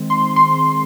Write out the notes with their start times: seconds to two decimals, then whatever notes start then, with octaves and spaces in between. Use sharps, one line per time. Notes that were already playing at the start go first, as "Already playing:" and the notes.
Already playing: D#3 G#3 C4
0.10 C6
0.36 C6